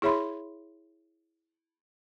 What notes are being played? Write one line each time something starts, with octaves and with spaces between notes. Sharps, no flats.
E4 G#4 C#5 E5 B5 C6